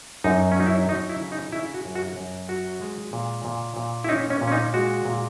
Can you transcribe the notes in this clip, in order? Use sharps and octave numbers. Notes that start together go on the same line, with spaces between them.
F#2 D#4
C#4
F#3 D#4
E4
F#3 D#4
E4
C#3
D#4
C#3 E4
F#4
F#2
F#4
F#2
F#3 F#4
G#3
A#2
A#2
A#2
E4
C#4 D#4
C#4
A#2
C#4
D#4
G#3 F#4
A#2